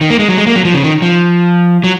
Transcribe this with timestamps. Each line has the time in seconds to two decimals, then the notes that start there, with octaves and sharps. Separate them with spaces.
0.01 D#3
0.10 A#3
0.19 G#3
0.28 F#3
0.38 G#3
0.47 A#3
0.56 F#3
0.65 F3
0.74 C#3
0.84 D#3
1.02 F3
1.84 F#3